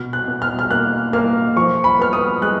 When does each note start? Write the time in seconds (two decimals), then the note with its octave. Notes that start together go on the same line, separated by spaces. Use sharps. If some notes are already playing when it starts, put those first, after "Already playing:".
Already playing: B2 F6
0.13 F#6
0.28 B2
0.42 F6
0.59 F6
0.70 A#3 F#6
1.13 A#3 F6
1.56 F3 C#6
1.84 B5
1.99 B3 F6
2.13 D#6
2.41 G#3 F#6